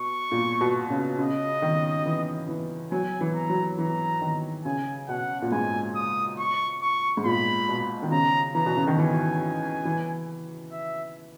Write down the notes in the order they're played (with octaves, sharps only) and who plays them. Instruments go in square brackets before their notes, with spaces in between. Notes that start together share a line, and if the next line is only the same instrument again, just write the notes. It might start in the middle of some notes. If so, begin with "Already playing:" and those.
Already playing: [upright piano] B2 [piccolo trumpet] C#6
[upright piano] A#2
B2
C#3
[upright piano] C#3 [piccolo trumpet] D#5
[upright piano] D#3
E3
E3
[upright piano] F#3 [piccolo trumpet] G#5
[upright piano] E3
[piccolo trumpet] A#5
[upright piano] F#3
[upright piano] E3 [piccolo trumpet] A#5
[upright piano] D#3
[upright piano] C#3 [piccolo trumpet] G#5
[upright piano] B2 [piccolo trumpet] F#5
[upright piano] A#2
[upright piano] G#2 [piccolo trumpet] G#5
[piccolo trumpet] D#6
C#6
C#6
[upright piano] G#2
[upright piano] A#2 [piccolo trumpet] B5
[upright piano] B2
D#3
[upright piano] C#3 [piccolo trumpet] A#5
[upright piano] E3 [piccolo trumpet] A#5
[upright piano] B2
C#3
D#3
[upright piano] E3 [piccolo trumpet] G#5
[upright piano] E3
[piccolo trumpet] E5